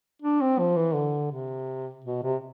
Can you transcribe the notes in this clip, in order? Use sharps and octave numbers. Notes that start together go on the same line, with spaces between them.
D4
C4
F3
E3
D3
C3
B2
C3